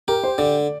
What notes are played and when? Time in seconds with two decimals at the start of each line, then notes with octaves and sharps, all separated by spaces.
0.08 G4 A#4
0.24 C5
0.38 D3 D5